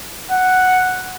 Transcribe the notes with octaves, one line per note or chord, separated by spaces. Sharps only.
F#5